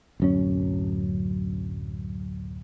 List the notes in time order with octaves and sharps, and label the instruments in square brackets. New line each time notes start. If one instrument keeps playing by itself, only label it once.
[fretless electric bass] D1 F#2 C#4